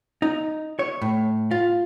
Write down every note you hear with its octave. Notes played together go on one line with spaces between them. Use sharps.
D#4
C#5
A2
F4